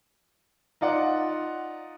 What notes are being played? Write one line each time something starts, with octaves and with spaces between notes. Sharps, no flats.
D#4 F4 D5 F#5